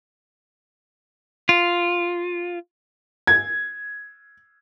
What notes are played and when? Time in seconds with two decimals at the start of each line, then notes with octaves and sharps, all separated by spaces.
1.49 F4
3.27 G#6